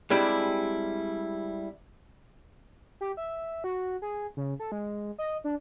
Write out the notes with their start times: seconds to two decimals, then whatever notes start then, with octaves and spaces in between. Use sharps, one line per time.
0.10 G3 G#3 C4 D4 E4 G4
3.01 G4
3.17 E5
3.64 F#4
4.02 G#4
4.37 C#3
4.60 A4
4.72 G#3
5.18 D#5
5.44 D4